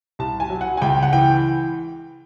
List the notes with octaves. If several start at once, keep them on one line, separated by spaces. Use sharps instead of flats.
C2 A5
G#5
F#3
F#5
G#5
C#2 G5
F#5
E3 G5